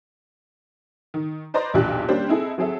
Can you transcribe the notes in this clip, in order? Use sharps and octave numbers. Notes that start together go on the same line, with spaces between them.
D#3
B4 C5 D5 D#5 A#5 C6
B1 E2 A#2 D4 G4 F#6
G3 A#3 C#4 D4 G4 C5
C4 D#4 E4 G#4 A4
F#3 C4 G#4 A4 E5